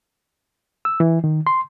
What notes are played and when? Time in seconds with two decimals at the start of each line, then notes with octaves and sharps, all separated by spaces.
0.85 E6
1.00 E3
1.24 D#3
1.47 C6